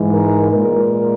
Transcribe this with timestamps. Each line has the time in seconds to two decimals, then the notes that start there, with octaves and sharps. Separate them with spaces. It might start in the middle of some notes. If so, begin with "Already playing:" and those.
Already playing: G#2 E3 G#3
0.12 A#4
0.52 A#2 G#3 A#4